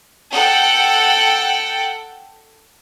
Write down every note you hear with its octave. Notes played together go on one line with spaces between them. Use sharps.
A4 F#5 G5